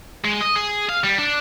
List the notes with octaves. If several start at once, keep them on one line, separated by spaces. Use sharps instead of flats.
G#3
D#5
G#4
F5
G3
D4